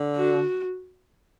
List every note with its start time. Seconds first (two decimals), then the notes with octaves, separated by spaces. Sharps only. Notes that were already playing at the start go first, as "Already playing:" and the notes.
Already playing: D3
0.16 F#4